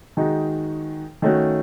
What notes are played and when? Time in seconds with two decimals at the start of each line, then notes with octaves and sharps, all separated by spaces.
0.17 D#3 G#3 D#4 F#4
1.22 D#3 A3 C#4 F#4